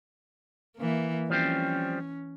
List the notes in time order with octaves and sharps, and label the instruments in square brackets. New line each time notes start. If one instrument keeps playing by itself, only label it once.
[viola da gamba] E3 A#3
[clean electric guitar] F3 G3 C4 [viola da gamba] C#4